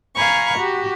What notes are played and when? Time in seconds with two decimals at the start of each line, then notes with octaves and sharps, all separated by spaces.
0.14 F5 G#5 A#5 B5 C#6
0.58 F#4 G4